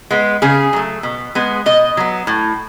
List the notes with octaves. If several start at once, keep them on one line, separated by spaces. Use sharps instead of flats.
G#3 B3
C#3 G#4
F#3 A3
B2
G#3 B3
B2 D#5
F#3 B3
A2